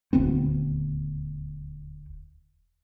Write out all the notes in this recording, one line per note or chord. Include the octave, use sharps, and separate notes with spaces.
D#1 D2 B3 C4